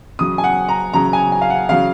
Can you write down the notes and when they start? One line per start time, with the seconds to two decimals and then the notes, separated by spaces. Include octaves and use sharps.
0.19 C#3 F#3 D#6
0.38 G#5
0.44 F#5
0.68 A#5
0.93 C#3 F#3 A#5
1.13 G#5
1.32 G#5
1.41 F5
1.50 F#5
1.69 C#3 F#3 F5